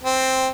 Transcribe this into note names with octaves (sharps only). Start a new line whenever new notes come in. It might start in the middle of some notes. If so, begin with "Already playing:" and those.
C4